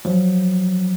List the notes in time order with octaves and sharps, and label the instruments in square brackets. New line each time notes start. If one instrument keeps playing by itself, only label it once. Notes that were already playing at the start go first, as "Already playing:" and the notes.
[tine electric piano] F3 F#3